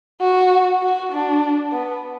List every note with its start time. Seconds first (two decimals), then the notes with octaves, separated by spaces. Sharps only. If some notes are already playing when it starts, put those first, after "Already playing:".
0.21 F#4
0.82 F#4
1.12 D4
1.73 B3